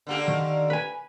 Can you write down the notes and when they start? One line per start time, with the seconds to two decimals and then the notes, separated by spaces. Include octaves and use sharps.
0.07 D3 A#3 G4
0.28 D#3
0.70 B4 G#5